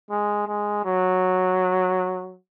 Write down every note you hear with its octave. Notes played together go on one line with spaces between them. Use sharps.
G#3
G#3
F#3